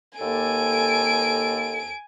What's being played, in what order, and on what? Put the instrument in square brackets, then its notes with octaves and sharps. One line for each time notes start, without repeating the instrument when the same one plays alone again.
[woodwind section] D#2 A#3 A4 [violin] G#5 D7